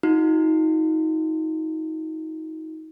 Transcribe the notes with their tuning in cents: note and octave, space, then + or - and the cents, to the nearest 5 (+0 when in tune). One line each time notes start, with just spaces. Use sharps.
D#4 +30 F#4 -35